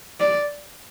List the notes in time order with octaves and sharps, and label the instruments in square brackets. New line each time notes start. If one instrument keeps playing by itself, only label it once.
[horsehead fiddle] D5